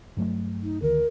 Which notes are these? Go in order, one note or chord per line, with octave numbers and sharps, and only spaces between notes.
G2 F#3 A3
D#4
D2 D#3 A#4